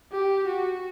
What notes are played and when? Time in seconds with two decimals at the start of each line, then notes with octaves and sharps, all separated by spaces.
0.12 G4
0.47 F#4